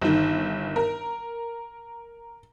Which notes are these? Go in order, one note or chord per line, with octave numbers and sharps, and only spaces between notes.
G1 D#3
A#4